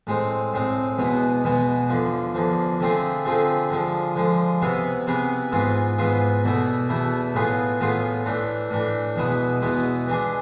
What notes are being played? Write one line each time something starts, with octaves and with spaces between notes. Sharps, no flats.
A2 G#3 C4
A2 G#3 C4
E2 B2 G#3 B3
E2 B2 G#3 B3
E2 D3 F3
E2 D3 F3
D3 A3 C4 F4 G#4
D3 A3 C4 F4 G#4
D3 F3 G#3
D3 F3 G#3
C3 E3 B3 E4 G#4
C3 E3 B3 E4 G#4
G#2 E3 B3 F4 G#4
G#2 E3 B3 F4 G#4
E2 B2 A3 E4
E2 B2 A3 E4
A2 E3 B3 F4 G#4
A2 E3 B3 F4 G#4
A2 E3 A3 D4
A2 E3 A3 D4
E2 B2 G#3 B3 E4
E2 B2 G#3 B3 E4
E3 G#3 D4 G#4